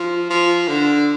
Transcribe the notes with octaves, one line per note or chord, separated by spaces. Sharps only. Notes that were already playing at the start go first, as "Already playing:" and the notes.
Already playing: F3
F3
D3